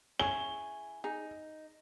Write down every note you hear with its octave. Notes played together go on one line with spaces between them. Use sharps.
C#4 E4 G#4 C#6 G7
D#4 G#4